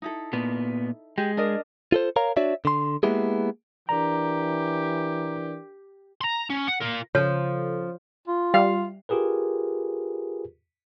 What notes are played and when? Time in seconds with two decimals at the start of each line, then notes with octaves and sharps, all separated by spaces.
0.02 D#4 E4 A4
0.33 A#2 B3
1.18 G#3 G4
1.37 D4 A#4 D#5
1.92 F4 A4 C5
2.16 A#4 C#5 F5 A#5
2.37 D4 F#4 C#5 D5 E5
2.65 D3 C6
3.03 G#3 A#3 B3 E4 G4 G#4
3.89 E3 D4 G4 A#4 D5 A#5
6.21 A#5 C6
6.50 C#4
6.68 F#5
6.81 F4 A#4
7.15 C#3 F3 A4 C#5
8.28 F4
8.54 G3 F5
9.09 F4 G4 G#4 A#4 B4